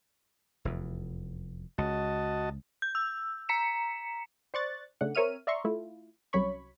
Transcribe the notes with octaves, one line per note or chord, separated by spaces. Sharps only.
F1 E2
C#2 F#4 D#5 A5
G6
E6
A#5 B6 C#7 E7
C5 D5 C#6 D6 F#6 A6
C#3 A3 D4 F#5
C4 A#4 C#5 E5 F6 D#7
D5 E5 A#5 C6 C#6
A3 E4 F4
C2 F#3 C#4 C#5 B5 C#6